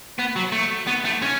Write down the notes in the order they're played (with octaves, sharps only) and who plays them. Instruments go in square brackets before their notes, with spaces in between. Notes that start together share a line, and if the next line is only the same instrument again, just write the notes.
[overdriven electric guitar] B3
F#3
A3
B3
A3
C#4